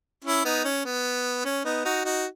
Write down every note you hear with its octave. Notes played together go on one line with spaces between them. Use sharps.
C#4 E4
B3 D#4
C#4
B3
C#4
B3 D#4
D#4 F#4
D#4 F#4